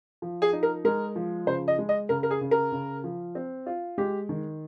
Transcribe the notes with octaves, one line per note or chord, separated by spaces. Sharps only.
F3
G#4
D#4
A#4
G#3 A#4
F3
C#3 C5
D#5
G#3
D#5
C#3 A#4
A#4
G#4
C#3
A#4
C#3
F3
C4
F4
G#3 G4
D#3